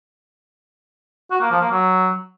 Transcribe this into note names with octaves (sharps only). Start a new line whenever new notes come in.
F#4
A#3
F3
A#3
F#3